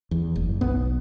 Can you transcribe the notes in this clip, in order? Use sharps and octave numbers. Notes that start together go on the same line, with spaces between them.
E2
F#1
B1 B3